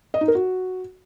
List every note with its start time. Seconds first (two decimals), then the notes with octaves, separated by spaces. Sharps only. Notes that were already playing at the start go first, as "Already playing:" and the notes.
0.14 D#5
0.21 D#4
0.28 A#4
0.35 F#4